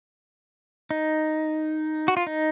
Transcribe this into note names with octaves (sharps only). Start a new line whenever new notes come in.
D#4
F#4
F4
D#4